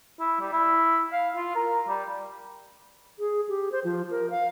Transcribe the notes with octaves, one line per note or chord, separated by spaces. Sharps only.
E4
G3
E4
F5
F4
A#4
G3
G#4
G4
C5
F3
A#4
F5